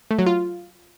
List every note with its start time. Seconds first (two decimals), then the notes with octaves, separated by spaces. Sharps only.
0.11 A3
0.19 F#3
0.26 F4